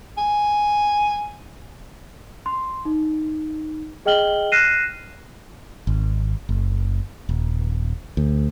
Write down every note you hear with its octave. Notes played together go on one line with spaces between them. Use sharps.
G#5
C6
D#4
G#4 D#5 G5 F6 F#7 G7
F6 F#6 A#6 C7 D#7 E7
G#1
F#1
D#1
D2